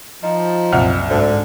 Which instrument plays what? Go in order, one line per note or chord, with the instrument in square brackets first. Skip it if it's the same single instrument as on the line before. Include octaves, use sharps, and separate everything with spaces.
[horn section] F3 [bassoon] D#4
[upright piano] C2 F#5 F6 [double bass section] F#2 A#2
[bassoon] D2 [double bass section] G#2 [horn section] D3